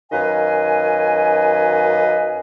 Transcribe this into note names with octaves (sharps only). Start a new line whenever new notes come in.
F#2 D#3 B4 D#5 F5 G#5